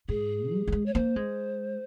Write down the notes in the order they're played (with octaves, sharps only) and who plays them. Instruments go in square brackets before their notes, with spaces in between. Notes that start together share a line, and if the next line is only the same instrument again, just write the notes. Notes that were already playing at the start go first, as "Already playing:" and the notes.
[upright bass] G#2 [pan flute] G#4
[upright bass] G3
G3
G#3
[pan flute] C#5
[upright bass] A#3 [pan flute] C5
[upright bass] G#3